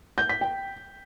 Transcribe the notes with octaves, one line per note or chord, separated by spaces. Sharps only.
G6
B6
G5